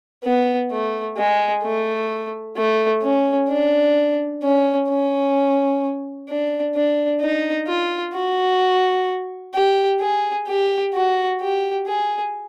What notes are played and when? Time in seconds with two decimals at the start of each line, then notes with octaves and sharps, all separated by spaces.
0.24 B3
0.71 A3
1.17 G#3
1.63 A3
2.56 A3
3.02 C#4
3.49 D4
4.43 C#4
4.89 C#4
6.29 D4
6.76 D4
7.21 D#4
7.68 F4
8.14 F#4
9.54 G4
10.01 G#4
10.47 G4
10.94 F#4
11.40 G4
11.87 G#4